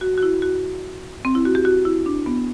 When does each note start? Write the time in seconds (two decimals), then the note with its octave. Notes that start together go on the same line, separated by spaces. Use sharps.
0.01 F#4
0.18 F#4
0.23 E4
0.42 F#4
1.25 C4
1.35 E4
1.45 F#4
1.55 G4
1.65 F#4
1.85 E4
2.06 D4
2.26 B3